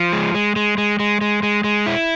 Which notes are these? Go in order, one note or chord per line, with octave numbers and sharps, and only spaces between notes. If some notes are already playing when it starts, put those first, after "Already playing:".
Already playing: F3
G#3
G#3
G#3
G#3
G#3
G#3
G#3
G#3
E4